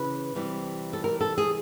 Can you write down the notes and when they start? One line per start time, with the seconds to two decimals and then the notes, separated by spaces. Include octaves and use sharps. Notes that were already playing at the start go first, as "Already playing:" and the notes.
Already playing: C#3 E3 B4
0.35 C3 E3 G3
0.93 A4
1.04 A#4
1.21 A4
1.38 G#4